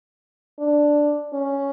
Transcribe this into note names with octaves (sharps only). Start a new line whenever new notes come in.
D4
C#4